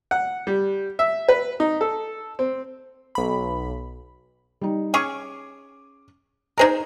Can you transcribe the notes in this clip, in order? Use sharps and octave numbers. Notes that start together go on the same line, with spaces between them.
F#5
G3
E5
B4
D#4
A4
C4
B1 B5
G3 D#4
C#4 G#4 C#6 D6
D#4 G#4 A#4 C5 D#5